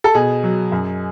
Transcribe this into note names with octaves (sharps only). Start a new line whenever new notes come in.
A4
B2 G#4
F#3
F#2